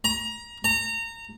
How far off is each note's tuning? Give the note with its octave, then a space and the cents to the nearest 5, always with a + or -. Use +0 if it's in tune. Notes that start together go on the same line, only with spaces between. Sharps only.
A#5 +25
A#5 -25